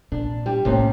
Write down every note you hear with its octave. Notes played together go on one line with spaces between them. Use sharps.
A#2 D4
G3
D#2 A2 C3 A3 C#4